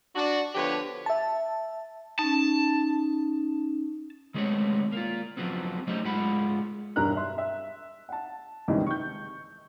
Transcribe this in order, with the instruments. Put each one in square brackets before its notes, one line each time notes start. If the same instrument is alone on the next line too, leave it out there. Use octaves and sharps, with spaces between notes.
[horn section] D4 F#4
D3 F3 B3 G4 B4 C#5
[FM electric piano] E5 A5
[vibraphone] C#4 D#4 [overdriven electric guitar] A5
[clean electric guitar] D#3 G#3 A3 B3 C4 C#5
A#3 F4
F3 F#3 B3 C4
F#3 G3 A3 D#4 C5 D#5
G#2 G#3 F4 F#5 B5
[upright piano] E1 G2 A#4 A#5 F#6
E5 C6
E5
F#5 A5
C#2 G#2 C3 D#3 E3 G3
C#6 G6